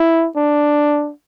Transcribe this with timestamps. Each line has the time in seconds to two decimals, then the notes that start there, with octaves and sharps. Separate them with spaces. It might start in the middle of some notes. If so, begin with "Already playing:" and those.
Already playing: E4
0.36 D4